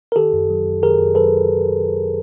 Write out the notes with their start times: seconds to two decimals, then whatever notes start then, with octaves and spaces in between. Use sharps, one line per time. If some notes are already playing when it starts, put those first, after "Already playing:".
0.12 A#4
0.16 D#3 G4 A4
0.33 F#2
0.50 F#3
0.67 F#2
0.83 D#3 G#4 A#4
1.00 F#2
1.15 F#3 A4 B4